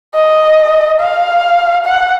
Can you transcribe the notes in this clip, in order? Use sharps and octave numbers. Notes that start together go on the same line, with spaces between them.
D#5
F5
F#5